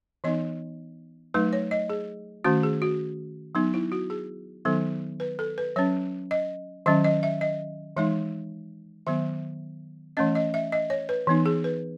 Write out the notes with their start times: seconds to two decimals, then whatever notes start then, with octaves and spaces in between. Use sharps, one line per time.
0.24 E3 B3 D#4 D#5
1.34 F#3 A3 D#4 B4
1.53 C#5
1.71 D#5
1.90 G#4
2.44 D#3 A3 C#4 F#4
2.63 G#4
2.82 F#4
3.55 F#3 B3 D#4
3.74 E4
3.92 F#4
4.10 G#4
4.65 D#3 F#3 B3 D#4 A4
5.20 B4
5.39 A4
5.58 B4
5.76 F#3 C#4 C#5
6.31 D#5
6.86 D#3 F#3 C#4 D#5
7.04 D#5
7.23 E5
7.41 D#5
7.97 E3 G#3 D#4 E5
9.07 D#3 F#3 B3 E5
10.17 E3 A3 C#4 D#5
10.35 D#5
10.54 E5
10.72 D#5
10.90 C#5
11.09 B4
11.27 E3 B3 D#4
11.46 G#4
11.64 B4